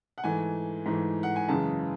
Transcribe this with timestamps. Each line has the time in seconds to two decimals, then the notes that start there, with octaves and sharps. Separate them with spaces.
0.18 F#5
0.24 G#2 E3 A3 G#5
0.86 G#2 E3 A3
1.23 F#5
1.36 G#5
1.49 F#2 C#3 E3 G#3 A5